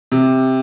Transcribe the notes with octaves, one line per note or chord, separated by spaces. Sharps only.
C3